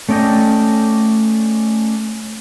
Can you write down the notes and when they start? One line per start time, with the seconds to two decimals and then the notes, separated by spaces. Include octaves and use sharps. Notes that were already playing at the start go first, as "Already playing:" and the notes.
0.09 A3 C#4 D5 D#5 G5